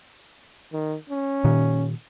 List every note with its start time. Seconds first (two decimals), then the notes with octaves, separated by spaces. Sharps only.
0.73 D#3
1.10 C#4
1.44 A#2 D#3